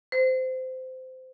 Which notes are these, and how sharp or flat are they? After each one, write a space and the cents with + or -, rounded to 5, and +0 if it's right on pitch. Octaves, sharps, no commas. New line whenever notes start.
C5 -20